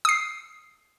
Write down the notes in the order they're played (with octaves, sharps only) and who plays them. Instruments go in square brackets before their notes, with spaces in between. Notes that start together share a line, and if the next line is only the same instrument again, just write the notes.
[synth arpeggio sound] D#6 C7